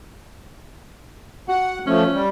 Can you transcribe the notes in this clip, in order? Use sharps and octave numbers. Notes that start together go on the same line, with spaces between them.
F#4 F#5
F3 A3 C#4
G3